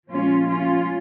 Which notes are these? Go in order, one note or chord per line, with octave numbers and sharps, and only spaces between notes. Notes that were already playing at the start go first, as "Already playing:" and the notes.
A#2 F3 G#3 C#4 F4
C#4 F4